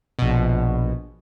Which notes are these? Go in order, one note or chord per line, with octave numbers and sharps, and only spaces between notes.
A#1 B2